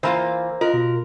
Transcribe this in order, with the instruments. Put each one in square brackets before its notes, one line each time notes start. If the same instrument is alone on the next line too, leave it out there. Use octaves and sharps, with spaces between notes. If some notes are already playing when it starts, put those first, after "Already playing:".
[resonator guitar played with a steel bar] E3 A#3 F4 [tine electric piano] C5 A#5
[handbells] F4 [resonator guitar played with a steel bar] A#4 [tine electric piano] D#5
[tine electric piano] B2